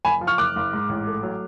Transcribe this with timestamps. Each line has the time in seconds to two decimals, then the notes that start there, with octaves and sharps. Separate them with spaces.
0.05 F#1 G#5 B5
0.21 F3
0.27 C#6 F6
0.38 F#1 D6 F#6
0.56 F#1
0.73 G#2
0.89 A1
1.07 A3
1.23 F#3